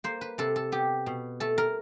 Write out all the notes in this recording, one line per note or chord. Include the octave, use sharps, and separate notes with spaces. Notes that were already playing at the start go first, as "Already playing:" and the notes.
A#3 C5
B4
C3 A4
A4
B3 G4
B2
A3 A4
A#4